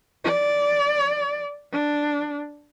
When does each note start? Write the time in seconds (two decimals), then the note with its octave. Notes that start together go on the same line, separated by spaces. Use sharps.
0.24 D5
1.72 D4